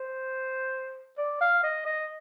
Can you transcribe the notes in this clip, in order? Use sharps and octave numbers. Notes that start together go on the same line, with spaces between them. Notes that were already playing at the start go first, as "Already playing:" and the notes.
Already playing: C5
D5
F5
D#5
D#5